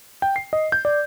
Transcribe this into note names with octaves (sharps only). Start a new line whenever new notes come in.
G5
C7
D#5
G6
D5